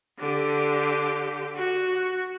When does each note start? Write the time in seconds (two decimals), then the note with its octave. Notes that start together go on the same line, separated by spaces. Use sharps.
0.19 D3 G4
1.56 F#4